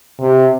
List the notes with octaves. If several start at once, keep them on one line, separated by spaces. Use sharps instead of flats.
C3